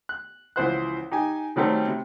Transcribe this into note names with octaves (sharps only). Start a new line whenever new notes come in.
F#6
C#2 E3 F3 C5 F#5 F#6
D#4 G4 G#5
D#3 F#3 G3 A3 C4 G4
C3